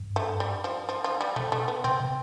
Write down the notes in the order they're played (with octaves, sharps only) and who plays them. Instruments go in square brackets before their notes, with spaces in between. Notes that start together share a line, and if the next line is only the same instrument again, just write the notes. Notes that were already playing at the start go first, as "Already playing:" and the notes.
Already playing: [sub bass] G2
[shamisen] A3
G3
F3
F3
F3
G3
[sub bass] B2 [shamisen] A3
[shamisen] A3
B3
[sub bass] B2 [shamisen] C4
[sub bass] C3